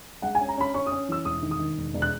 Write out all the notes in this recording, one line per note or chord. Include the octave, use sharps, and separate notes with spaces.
G#3 F#5
G#5
C#4
A#5
C#4 B5
C#4 C#6
D#6
C#4
E3 E6
E1 D#6
D#3
D#6
D#3
E1
E1
F#6